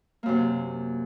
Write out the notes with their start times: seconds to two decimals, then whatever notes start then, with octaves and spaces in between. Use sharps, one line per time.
0.23 A#3
0.26 F#2
0.28 C3